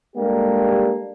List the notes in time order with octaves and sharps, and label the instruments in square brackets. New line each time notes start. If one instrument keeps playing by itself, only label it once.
[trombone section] G3 G#3 A#3 D4 G4 A4